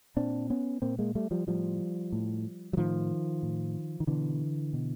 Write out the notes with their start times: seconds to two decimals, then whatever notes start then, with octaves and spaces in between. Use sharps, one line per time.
0.17 A#2 C4 D4
0.50 B3 C#4
0.82 A#2 A#3 C4
0.99 G#3 A#3
1.15 G3 A3
1.31 F3 G3
1.47 A2 F3 G3
2.12 A2
2.73 F#3
2.77 A2 D#3 F3
3.43 A2
4.00 D#3
4.07 B2 D3 E3
4.73 B2